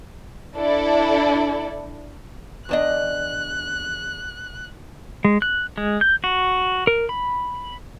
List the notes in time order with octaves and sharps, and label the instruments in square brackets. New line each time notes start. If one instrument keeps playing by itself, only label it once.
[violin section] D4 E4 A4 D5
[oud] E2 D4 D#5 [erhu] F#6
[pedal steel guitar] G#3
F#6
G#3
G6
F#4
A#4
B5